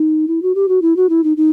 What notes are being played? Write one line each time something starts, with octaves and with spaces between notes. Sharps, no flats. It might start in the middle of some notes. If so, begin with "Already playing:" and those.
Already playing: D#4
E4
F#4
G4
F#4
E4
F#4
E4
D#4
D#4